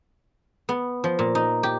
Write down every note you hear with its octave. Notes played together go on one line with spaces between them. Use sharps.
B3
F3
A#2
D#4
G4